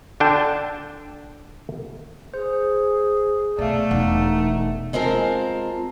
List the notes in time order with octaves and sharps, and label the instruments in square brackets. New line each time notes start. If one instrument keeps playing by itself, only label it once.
[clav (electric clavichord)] D3 D4 G5 A5
[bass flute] G#4 [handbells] C5
[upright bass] B2 [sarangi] A3 [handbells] D5 F5
[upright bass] E1 [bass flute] D#4 [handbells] F#5
[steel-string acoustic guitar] G#3 C4 F4 A#4 A5